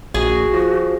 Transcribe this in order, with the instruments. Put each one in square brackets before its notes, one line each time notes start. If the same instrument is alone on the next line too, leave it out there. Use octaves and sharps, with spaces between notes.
[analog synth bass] A#1 [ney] F#4 [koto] G#4
[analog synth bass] F3